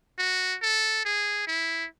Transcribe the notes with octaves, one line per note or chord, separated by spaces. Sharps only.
F#4
A4
G#4
E4